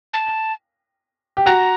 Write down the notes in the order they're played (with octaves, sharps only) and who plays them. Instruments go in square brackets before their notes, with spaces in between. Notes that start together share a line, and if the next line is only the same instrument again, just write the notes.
[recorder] A5
[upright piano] G4
[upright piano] F#4 [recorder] A#5